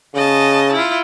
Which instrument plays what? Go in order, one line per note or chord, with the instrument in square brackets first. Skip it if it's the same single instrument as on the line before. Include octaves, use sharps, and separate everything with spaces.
[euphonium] C#3 [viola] D#5 A5
[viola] E4 F4